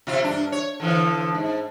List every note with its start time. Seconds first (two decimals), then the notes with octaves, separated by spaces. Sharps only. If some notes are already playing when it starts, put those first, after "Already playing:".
0.07 C3 F4
0.24 G2 D4
0.52 C#5
0.80 D3 E3 F3
1.34 G#2